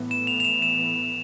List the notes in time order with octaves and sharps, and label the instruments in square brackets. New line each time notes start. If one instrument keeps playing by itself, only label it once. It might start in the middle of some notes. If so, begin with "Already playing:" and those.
Already playing: [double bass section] A2 E3 B3
[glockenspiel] E7
F7
F7
E7
E7